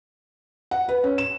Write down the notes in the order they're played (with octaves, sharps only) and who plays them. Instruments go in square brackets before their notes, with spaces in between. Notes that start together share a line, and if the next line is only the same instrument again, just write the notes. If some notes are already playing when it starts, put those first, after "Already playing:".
[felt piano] F#5
B4
C#4
E7